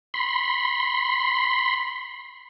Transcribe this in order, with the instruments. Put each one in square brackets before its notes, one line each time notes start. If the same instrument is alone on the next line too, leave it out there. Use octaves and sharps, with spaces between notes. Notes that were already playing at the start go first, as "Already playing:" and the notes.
[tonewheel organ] B5 C6